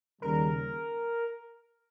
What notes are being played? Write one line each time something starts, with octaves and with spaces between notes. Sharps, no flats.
D#2 C#3 G3 A#4